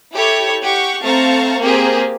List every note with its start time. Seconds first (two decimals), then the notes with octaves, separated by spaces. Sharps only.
0.13 E4 G4 A4 C#5
0.63 G4 F#5 C#6
1.03 A3 C4 F5 A5 A#5 C#6
1.60 A#3 C4 G4 G#4 A#4